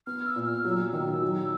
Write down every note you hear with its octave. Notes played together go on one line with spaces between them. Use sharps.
B3 F6
E6
A#2
F6
F#3 E6
D#3 E6
F#3